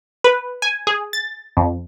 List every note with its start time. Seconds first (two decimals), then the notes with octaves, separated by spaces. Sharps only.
0.24 B4
0.62 G#5
0.87 G#4
1.13 A6
1.57 F2